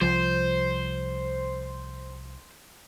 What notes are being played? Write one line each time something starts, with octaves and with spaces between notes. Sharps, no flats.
C2 F3 C5